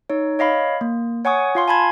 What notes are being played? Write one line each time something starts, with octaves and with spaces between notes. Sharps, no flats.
D#4 C#5
C#5 D#5 F5 B5
A#3
C#5 F#5 G#5 C#6 D#6
F4 F5 C6
G#5 A5 B5 G#6